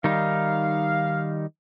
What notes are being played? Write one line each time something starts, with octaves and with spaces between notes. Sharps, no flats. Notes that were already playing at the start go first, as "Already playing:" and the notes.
D#3 G3 D#4 F5